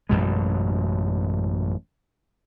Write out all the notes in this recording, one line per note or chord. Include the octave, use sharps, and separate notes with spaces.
A1 F#2 B2 G#3